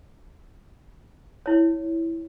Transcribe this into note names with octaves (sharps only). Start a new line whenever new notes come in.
E4 C#5